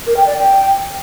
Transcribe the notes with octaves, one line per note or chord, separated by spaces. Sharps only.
A#4
G5
D5
G5